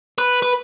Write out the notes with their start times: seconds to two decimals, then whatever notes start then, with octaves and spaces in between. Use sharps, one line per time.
0.18 B4
0.42 B4